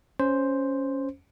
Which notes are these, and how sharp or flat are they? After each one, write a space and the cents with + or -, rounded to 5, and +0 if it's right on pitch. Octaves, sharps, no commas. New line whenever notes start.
C#4 +0 C5 +0